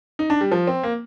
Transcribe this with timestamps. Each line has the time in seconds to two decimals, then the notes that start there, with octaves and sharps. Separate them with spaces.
0.19 D#4
0.30 D4
0.41 G3
0.52 F3
0.67 C4
0.83 A#3